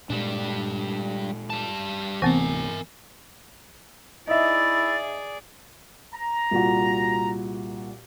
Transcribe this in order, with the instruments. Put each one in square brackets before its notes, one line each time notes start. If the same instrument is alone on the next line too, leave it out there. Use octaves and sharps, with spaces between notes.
[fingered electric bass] A#2 G#3 [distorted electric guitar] G3 D4
[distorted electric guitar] G3 A5
[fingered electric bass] D1 C3 A3 [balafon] E3 B3 C4 [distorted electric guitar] A#4 G#5
[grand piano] D#4 E5 [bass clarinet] E4 [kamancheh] G#4 D5 [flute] A6
[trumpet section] A#5
[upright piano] C2 A#2 F#4